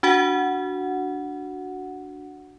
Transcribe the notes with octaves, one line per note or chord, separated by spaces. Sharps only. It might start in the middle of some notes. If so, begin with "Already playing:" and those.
D4 F#4 F#5